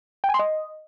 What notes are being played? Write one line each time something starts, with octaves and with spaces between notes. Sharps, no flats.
G5
G#5
C6
D#5